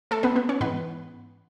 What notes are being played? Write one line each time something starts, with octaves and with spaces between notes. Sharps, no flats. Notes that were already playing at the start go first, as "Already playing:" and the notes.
A3 A4
B3 B4
B3 B4
C#4 C#5
G#2 E3 B3 B4